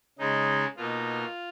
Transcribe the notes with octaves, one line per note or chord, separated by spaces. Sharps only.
C#3 G#3 D#4
B2 A#3 D#4 F4